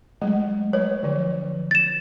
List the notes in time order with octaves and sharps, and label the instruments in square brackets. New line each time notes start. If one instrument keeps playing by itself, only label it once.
[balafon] F#3 G#3 A3
[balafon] F#3 B4 [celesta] C#5
[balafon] D3 F3
[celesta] A6 E7